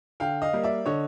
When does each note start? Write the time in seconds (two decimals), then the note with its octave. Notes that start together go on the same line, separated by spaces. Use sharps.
0.20 D3 F5 G5
0.42 D#5 F5
0.53 G3 A#3
0.63 D5 E5
0.86 D3 C#5 D#5